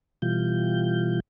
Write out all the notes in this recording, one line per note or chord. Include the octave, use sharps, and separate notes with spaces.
B2 E3 G3 F4 G6